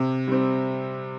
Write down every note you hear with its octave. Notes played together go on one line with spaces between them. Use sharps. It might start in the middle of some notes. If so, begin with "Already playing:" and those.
Already playing: C3
G3 C4